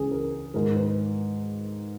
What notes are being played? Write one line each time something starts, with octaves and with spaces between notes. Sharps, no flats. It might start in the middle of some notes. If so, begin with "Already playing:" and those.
Already playing: C#2 C#3 E3 G#4
A#4
G#2 D#3 A#4
B4